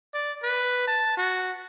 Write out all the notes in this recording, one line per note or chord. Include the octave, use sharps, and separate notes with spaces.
D5
B4
A5
F#4